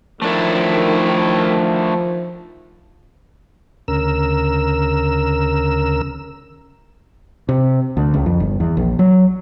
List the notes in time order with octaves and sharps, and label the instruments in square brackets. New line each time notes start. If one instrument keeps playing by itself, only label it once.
[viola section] D#3 [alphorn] F3 [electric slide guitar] A3 D4 E4
[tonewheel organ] D2 C#3 A#4 E6
[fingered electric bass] C3
D2
C#2
F2
G1
E2
A#1
F#3